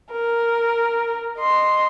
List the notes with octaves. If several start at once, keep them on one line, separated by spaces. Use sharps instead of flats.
A#4
D#5 C6